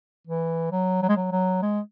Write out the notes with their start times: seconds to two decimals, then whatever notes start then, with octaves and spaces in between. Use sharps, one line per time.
0.27 E3
0.72 F#3
1.02 F#3
1.09 G#3
1.16 F#3
1.32 F#3
1.62 G#3